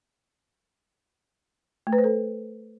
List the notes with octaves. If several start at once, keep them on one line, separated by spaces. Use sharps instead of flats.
A3
B4
C5
A4